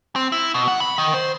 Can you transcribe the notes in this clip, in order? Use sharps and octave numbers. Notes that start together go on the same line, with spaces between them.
C4
E4
B2
F#5
B5
D#3
C5